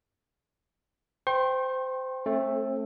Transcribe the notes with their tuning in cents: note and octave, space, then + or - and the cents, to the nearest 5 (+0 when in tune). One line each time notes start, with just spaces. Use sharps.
C5 -20 G5 +0 C6 +45
A3 +0 C4 +40